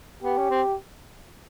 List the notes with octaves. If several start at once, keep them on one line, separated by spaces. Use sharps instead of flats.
B3 G4
C#4
C4